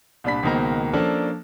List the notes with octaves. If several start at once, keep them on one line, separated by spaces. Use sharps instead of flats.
C2 A#2 D4 B5 B6
C#2 B2 D#3 A#3 C5 A#5
F3 A#3 C#4 D4 A4